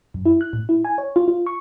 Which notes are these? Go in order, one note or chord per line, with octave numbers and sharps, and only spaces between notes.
F#2
E4
F#6
A2
E4
G#5
C#5
F4
F4
C#6